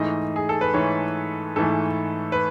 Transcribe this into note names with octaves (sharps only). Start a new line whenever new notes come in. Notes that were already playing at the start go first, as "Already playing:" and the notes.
Already playing: G#2 E3 A3 D#5
G#4
A4
B4
G#2 E3 A3 C#5
G#2 E3 A3 A4
B4